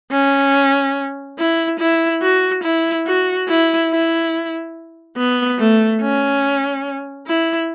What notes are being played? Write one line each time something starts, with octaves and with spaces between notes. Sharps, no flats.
C#4
E4
E4
F#4
E4
F#4
E4
E4
B3
A3
C#4
E4